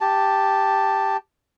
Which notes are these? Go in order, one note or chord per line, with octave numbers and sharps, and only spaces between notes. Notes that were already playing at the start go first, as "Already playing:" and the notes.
G4 A5